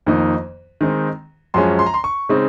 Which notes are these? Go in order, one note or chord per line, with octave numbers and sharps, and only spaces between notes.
F2 D#3 A#3 D#4
D#3 G#3 C4 D#4
F#2 F3 G#3 C#4 C6
C6
A#5
C6
C#6
C#3 G#3 C4 D#4